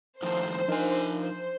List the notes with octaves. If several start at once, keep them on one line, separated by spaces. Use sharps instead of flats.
A2 D#3 F3 C5
F3 D4 D#4 A#4 G#5
C5